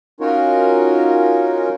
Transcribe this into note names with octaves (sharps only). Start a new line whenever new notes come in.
C#4 D#4 F4 F#4 A#4 C#5